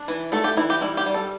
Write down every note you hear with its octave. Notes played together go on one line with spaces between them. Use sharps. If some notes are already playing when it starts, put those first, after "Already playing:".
Already playing: D4
E3
A3 A4
G4
E3 E4
G4
G3 E4
G4
G3
A4